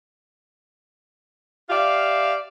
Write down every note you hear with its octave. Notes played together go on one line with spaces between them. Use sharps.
G4 D5 E5 F5